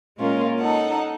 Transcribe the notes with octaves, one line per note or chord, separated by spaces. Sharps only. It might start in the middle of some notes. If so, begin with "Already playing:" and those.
A#2 G#3 A#3 C#4 F4 A#4
D#4 A4 F#5